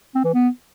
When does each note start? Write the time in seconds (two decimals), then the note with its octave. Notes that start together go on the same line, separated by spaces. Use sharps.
0.15 C4
0.25 E3
0.34 B3